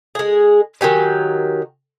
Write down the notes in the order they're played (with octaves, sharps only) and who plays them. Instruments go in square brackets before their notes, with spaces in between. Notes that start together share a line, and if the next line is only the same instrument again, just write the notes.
[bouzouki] G#3 G#4
D#3 F#3 G4 G#5